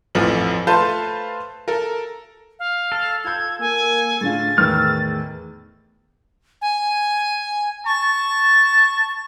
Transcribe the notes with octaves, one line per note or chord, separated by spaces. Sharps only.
A1 F2 E3 F3 A3 F#7
A3 F4 B4 C5 A5 G6
A4 A#4
F5
A4
F4 G6 G#6
A#3 G#5
A2 D3 F4 G#4 A6
E2 A2 D#3 E6 F6
G#5
A5 C#6